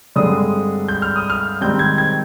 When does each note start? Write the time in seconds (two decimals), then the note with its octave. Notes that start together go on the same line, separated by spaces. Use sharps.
0.16 G2 D3 G#3 C4 D#6
0.88 G6
1.02 F6
1.16 D#6
1.30 F6
1.61 G#2 D#3 G3 C4 G6
1.79 G#6
1.98 G#6